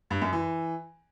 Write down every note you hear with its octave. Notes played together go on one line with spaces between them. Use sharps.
G2
F#2
E3